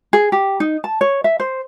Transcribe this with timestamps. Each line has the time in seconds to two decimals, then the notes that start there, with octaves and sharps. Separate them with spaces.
0.13 G#4
0.32 G4
0.60 D#4
0.84 A5
1.01 C#5
1.24 E5
1.40 C5